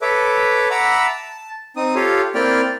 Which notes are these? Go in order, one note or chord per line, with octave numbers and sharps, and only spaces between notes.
A4 B4 C#5 E5 D6
E5 F#5 A#5 B5 D6 E6
A5
C4 D#4 D#6
F4 G4 A4 C#5 F5
A#3 C4 E4 D5 G5 F6